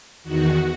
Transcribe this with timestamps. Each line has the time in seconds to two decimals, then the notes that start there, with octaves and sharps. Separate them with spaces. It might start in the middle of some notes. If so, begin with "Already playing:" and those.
0.23 E2 D#3 F#4